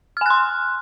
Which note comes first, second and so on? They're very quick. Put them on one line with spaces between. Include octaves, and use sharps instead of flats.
F6 G#5 F#6 C6